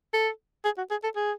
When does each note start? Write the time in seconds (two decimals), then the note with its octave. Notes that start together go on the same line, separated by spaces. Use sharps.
0.13 A4
0.65 G#4
0.78 F#4
0.91 G#4
1.03 A4
1.16 G#4